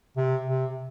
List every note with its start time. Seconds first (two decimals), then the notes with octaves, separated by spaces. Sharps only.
0.17 C3
0.46 C3